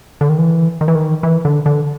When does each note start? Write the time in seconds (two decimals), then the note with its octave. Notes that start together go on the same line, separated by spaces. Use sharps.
0.21 D3
0.29 D#3
0.38 E3
0.81 D#3
0.88 E3
0.95 D#3
1.23 E3
1.45 D3
1.66 D3